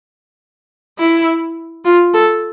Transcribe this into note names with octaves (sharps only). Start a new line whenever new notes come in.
E4
F4
A4